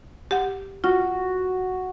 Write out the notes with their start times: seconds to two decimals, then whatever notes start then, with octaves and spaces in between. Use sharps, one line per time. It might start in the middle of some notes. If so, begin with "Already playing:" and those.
0.31 G4 F#5
0.84 F4 F#4